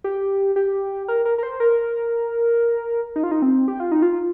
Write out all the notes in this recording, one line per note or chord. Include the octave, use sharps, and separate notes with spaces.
G4
G4
A#4
A#4
A#4
C5
A#4
D#4
F4
D#4
C4
G4
F4
D#4
F4